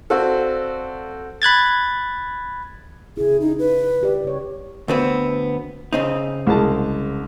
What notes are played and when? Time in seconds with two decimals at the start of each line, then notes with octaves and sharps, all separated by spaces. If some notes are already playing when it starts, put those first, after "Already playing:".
0.10 C4 F#4 A4 C5 D5 F5
1.42 B5 F#6 G#6 A6
3.17 C#3 E4 G#4
3.41 D#4
3.59 B4
4.01 G3 G4 D5
4.24 C#3 C#5
4.88 D2 B3 C4
5.93 C#3 C4 D#4
6.47 C2 G#3 A5